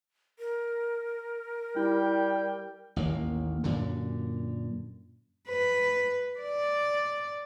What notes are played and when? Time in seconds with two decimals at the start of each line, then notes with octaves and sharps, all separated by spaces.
0.39 A#4
1.76 G3 E4 G5
2.96 A1 D#2 A#3
3.64 F#2 A#2 D3
5.49 B4
6.39 D5